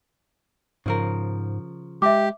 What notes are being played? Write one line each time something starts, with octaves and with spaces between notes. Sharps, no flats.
G#2 C#3 F3 A#4
G#3 G4 E5 D6